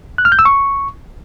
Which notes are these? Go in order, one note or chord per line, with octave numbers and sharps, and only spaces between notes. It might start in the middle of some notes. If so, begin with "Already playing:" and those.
F#6
F6
G6
E6
C#6